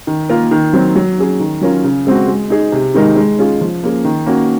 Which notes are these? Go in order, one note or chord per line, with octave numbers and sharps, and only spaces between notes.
D#3
A#3 F4 A#4
D#3
F#3 C4
F#3
C#4 G#4
D#3
F#3 C#4 F4 A#4
C#3
G#3 C4 F#4
G#3
D#4 G#4
C3
D#3 G#3 D#4 A#4
G#3
C#4 F4 G#4
F3
A#3 C#4 G#4
D#3
A#3 C#4 F#4